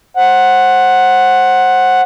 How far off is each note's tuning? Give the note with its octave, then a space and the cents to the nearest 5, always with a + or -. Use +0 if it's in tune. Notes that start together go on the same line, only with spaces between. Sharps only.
C5 +25 F#5 +0